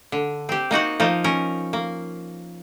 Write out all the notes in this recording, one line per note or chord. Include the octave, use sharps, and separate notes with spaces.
D3
C4 G4
A#3 D#4 F#4 F#5
F3 A#3 D#4
C#4 A#4
A#3